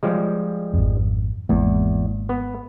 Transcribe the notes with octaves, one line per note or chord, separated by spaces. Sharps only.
F3 G3 G#3
G#1 F2
G#1 E2 G#3 A#3
B3